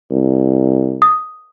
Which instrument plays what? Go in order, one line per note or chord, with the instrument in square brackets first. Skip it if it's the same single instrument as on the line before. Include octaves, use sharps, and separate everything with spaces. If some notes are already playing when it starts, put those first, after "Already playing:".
[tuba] C2
[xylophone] D#6